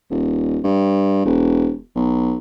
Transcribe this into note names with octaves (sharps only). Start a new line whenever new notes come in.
D#1
G2
E1
B1